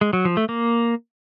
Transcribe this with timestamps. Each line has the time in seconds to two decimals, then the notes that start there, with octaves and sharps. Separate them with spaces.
0.01 G#3
0.13 F#3
0.25 F3
0.37 A3
0.49 A#3